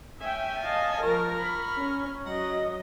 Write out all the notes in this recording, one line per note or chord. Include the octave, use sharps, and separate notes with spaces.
C#4 E5 G5 G#5
D#5 F5 A5
F3 A#4 A#5 C#6 F6
B5
C#4
F#3 D#5 F#5 A#5